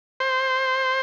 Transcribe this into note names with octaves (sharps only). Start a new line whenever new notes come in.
C5